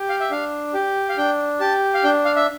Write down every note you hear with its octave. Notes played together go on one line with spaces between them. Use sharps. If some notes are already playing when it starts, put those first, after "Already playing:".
Already playing: G4
F5
E5
D4 F5
G4
F5
D4 G5
G4 A5
F5
D4 G5
F5
E5